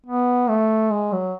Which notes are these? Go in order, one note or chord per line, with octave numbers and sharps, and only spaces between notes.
B3
A3
G#3
F#3